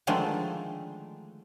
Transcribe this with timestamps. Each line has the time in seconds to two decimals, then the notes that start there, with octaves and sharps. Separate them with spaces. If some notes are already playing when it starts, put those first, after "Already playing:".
0.07 D3 D#3 F3 G#3 A3 D4